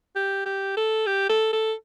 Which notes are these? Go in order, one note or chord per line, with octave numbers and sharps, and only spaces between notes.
G4
G4
A4
G4
A4
A4